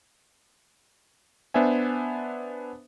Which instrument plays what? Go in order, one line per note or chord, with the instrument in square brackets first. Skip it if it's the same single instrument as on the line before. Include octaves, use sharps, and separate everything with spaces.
[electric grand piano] B3 D4 C5 E5 G#5